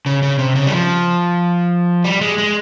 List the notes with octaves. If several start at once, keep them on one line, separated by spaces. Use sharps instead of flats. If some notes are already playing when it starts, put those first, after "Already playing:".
C#3
C#3
C3
C#3
G3
F3
G3
G#3
G#3